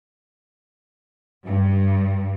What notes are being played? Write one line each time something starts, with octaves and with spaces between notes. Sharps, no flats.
G2